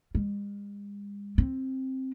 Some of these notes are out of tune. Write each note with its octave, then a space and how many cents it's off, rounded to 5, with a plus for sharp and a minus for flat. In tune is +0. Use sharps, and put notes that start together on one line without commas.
G#3 -45
C4 +10